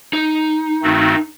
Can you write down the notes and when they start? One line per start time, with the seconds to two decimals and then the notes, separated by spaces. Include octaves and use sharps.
0.13 D#4
0.82 G2 D#3 A3 C4 F#4